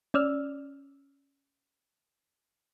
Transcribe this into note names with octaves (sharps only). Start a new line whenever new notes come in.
C#4 D5 E6 F6